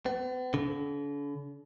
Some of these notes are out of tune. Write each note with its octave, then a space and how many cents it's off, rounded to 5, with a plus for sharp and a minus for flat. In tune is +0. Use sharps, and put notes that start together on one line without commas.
B3 +45
D3 -45